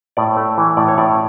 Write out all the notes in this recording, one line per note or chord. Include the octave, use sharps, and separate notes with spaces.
A2 D5
A3
E3
A2 D5
C#5
A2 D5